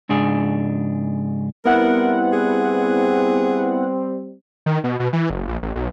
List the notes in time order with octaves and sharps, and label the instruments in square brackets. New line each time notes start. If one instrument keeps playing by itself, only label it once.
[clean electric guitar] C#2 G#2 D4 G#4
[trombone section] G3 C4 [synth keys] B3 E4 F#5 [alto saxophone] A#4
[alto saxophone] G#4
[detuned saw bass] D#3
B2
B2
E3
F#1
A#1
A1
B1